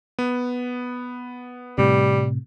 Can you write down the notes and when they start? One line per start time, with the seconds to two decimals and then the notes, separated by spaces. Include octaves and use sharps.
0.19 B3
1.78 A2 C3 G3